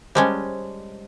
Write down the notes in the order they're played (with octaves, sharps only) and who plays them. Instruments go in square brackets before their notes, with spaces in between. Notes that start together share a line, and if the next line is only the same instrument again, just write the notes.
[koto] G3 G#3 C#4 [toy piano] C5 D#5 A5